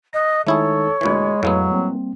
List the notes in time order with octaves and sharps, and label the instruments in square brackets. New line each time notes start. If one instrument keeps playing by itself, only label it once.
[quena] D#5 [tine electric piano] F#6 A#6
[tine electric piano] D#3 G#3 D#4 [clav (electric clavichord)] A3 E4 G#4 [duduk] A4 [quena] C#5
[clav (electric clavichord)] D2 A#2 E3 [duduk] G#3 [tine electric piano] B5 G#6
[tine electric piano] F2 F5 [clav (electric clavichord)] A2 G#3 B3 [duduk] F#3
[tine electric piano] G3 A#3 C4